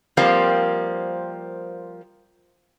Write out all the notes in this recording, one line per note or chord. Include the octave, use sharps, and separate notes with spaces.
F3 G3 A#3 C4